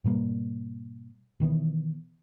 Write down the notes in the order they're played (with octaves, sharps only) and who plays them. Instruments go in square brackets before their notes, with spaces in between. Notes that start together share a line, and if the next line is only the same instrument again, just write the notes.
[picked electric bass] G#2 B2 G3 A#3
B2 D#3 E3 B3